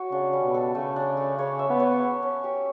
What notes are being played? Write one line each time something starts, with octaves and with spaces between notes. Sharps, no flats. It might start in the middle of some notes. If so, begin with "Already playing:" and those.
Already playing: F#4 C#5
C#3 D4
G3
B2
A4
C#3 A3
D4
A3
C#3 C#5
E5
B3
C#5
C#5
C#4
G4